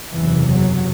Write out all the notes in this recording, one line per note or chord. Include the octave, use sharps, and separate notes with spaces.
F#1 E2 C3 E3
F#3